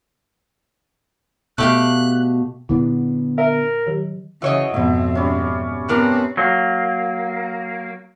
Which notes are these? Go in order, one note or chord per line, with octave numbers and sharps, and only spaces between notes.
B2 A3 G4 F5 F#6
A#2 D3 B3 D4 E4
A#4 E5
D#3 F#3 G4
C#3 E3 F#3 C#5 D#5 E5
F2 G#2 B2 C4 E5
G3 C#4
G3 B3 C4 D4 A#4
F#3 A#3